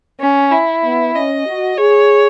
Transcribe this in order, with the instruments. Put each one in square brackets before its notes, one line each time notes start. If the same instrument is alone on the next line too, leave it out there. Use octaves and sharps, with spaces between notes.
[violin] C#4
E4
[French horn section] B3
[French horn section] C#4 [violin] D#5
[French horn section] F#4
[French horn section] G#4 [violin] C#5